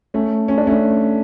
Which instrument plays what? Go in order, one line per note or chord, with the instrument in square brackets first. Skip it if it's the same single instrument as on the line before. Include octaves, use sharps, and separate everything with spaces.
[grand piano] A3 C#4
C#4
D4
A3 C#4